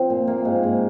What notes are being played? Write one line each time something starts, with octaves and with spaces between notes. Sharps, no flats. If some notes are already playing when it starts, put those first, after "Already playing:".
Already playing: F3 C4
A#2
A#3
G#2
G#2